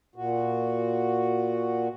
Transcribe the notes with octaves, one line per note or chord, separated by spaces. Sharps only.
A#2 F#4